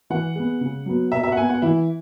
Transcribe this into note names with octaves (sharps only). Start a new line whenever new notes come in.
E3 F#5
G#3 B3
C#3
F#3 B3
B2 E5
E5
F#5
B3 G#5
F#5
E3 E4